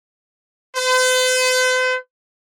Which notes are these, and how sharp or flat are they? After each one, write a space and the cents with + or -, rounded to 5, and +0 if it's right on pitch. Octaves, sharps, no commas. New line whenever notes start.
C5 -45